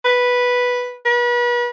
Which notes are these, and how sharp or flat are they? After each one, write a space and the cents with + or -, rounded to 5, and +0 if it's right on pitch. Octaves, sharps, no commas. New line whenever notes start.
B4 -5
B4 -35